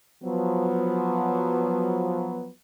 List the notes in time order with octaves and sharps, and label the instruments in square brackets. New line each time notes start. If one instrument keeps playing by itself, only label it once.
[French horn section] F3 F#3 B3